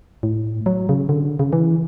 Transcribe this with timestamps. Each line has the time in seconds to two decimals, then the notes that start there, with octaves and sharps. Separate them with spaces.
0.23 A2
0.66 F#3
0.89 C#3
1.09 D3
1.39 C#3
1.53 E3